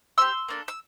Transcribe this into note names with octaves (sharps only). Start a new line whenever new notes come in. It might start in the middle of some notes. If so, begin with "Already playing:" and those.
C4 G4 C6 E6
A#3 D4 A4
E6